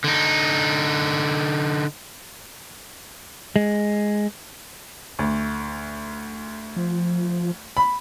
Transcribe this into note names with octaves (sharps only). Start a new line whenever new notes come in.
D3 D#4
G#3
D2
F3
B5